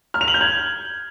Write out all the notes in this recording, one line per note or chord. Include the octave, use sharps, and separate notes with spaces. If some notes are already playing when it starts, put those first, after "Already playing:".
F6
F7
F#7
G6
G#6